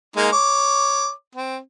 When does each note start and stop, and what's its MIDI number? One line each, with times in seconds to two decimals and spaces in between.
0.16 0.30 56
0.16 0.30 58
0.16 0.30 63
0.32 1.10 73
0.32 1.10 86
1.35 1.58 60